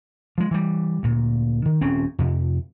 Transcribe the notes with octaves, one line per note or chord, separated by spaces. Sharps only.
F3 G#3
E3 G3
D2 A#2
D#3
D#1 C4 C#4
F2 C3